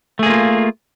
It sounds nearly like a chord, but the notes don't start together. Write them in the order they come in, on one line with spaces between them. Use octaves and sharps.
A3 G#4 A#3 F4